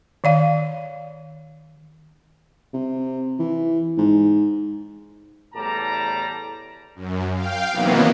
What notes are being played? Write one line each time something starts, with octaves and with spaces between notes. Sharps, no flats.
D#3 D5 F5
C3
E3
G#2
E2 A2 G3 D5 A5 A#5
F#2
F5 G5
C3 D#3 E3 F#3 A#3 B3